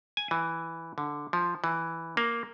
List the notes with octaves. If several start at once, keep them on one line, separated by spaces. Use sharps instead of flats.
G#5
E3
D3
F3
E3
A#3